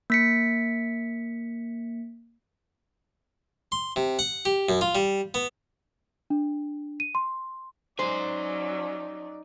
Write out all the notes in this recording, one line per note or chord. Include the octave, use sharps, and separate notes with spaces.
A#3 B6 C#7
C6
C3
F#5
G4
F#2
F4
G3
B3
D4
D#7
C6
F#3 C#4 D#4 C5 D5 G#5